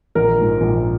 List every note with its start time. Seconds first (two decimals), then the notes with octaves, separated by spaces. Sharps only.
0.15 A#1 A#4
0.38 G#2 F3
0.61 A#1